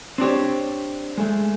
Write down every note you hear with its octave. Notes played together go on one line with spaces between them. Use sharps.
C4 D4 G4 C#5
G#3 A3